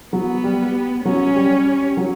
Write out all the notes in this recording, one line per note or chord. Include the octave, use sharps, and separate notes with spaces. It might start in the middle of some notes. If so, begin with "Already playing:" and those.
F#3 B3
G3
F#3 C#4
G3
F#3